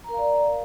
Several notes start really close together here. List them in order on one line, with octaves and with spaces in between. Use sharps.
A#5 A#4 F5 D5